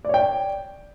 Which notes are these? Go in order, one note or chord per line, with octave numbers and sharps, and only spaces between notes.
C#5 D5 G5